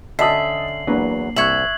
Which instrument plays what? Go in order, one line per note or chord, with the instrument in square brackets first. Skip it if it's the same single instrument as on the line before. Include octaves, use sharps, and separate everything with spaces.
[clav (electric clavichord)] D3 C#4 [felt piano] D#5 A5 D#6 [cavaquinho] E5 [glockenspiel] C7 F#7
[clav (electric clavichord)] E2 F#3 B4 [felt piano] A#3 D4
[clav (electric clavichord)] C2 [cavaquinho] E5 C#6 [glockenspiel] F#6 G#6 F#7